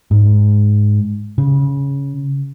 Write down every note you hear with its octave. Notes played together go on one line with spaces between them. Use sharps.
G#2
C#3